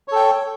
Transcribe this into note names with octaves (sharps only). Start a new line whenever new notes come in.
A4 C#5 G5